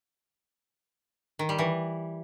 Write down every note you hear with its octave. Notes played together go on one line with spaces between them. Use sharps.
D#3
G3
E3